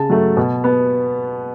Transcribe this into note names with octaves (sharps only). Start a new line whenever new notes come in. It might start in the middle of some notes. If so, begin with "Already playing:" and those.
Already playing: C#3 A5
F#3 A3
B2
B3